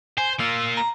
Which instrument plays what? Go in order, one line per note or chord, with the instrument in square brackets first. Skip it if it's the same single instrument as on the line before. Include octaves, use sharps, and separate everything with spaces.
[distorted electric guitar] C5 [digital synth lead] G#5
[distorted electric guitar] A#3 F4 [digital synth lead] E6
[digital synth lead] A#5